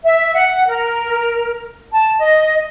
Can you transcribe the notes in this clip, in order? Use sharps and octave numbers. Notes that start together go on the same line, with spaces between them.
E5
F#5
A#4
A5
D#5